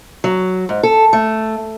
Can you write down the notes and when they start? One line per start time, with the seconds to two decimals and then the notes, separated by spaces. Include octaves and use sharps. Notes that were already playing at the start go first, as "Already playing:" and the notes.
0.24 F#3
0.69 G#2
0.83 A4
1.13 A3